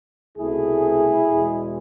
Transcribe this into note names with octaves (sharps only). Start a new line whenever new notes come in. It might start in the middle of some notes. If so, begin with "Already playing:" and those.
C2 B2 A3 E4 G#4
E2 B2 G#3